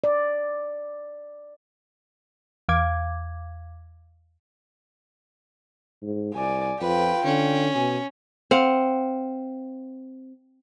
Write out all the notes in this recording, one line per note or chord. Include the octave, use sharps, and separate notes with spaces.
D5
E2 F5 D6 G#6
G#2
C2 D5 G#5
F2 F4 B4 G5
D3 C#4
B2 G#5
C4 F5 F#5